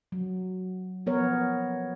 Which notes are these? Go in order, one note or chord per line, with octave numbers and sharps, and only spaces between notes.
F#3
F3 B3 A#4 C#5